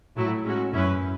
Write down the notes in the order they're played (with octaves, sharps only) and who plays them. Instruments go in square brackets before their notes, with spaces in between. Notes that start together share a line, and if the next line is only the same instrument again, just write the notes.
[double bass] A2 [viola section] F#3 A3 E4
[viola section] G#3 C#4 F#4
[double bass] F#2 [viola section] C#4 E4 B4